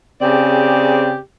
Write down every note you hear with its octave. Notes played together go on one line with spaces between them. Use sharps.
C#3 C4 G4 G#4 D5